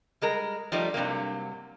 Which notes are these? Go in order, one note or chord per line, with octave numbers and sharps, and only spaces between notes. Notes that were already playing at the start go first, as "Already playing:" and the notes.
G3 G#3 A#4
F3 G3 A3 D#4
G2 C3 F#3 A#3